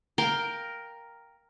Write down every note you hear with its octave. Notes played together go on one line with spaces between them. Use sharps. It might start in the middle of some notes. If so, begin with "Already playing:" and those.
A#4 F5 G5